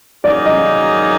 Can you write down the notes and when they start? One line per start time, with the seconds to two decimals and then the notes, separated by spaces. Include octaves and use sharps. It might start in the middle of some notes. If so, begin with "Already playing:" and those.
0.24 D#3 F#3 A#3 D#4 G#4 D5
0.45 D#5